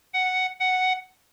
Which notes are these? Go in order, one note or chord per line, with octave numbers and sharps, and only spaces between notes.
F#5
F#5